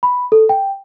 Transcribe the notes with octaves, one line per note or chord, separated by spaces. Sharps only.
B5
A4
G5